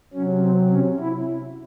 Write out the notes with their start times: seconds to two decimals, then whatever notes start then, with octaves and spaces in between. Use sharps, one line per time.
0.14 C3 F#3 C#4
0.42 C4
0.71 C#4
1.00 E4